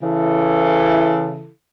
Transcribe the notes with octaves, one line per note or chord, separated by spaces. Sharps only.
C#3 E3 E4 A4